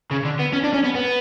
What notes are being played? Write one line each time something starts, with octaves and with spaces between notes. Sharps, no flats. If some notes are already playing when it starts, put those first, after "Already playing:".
C#3
D3
B3
C#4
D4
C#4
B3
B3